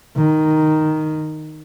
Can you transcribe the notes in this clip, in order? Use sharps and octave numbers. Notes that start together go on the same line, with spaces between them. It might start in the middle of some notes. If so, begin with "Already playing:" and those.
D#3